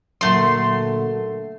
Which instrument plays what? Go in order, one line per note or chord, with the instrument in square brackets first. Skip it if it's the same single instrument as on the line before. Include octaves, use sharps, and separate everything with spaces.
[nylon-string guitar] A#2 D3 F#3 [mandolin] A3 C6